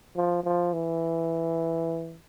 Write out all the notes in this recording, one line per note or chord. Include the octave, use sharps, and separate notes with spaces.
F3
F3
E3